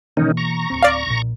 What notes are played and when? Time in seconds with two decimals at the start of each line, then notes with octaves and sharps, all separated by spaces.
0.17 B2 D#3 E3 A#3 C#4 D#4
0.37 A#5 C#6
0.70 D1 G#1 C4
0.83 D5 F5
1.06 B1 A#2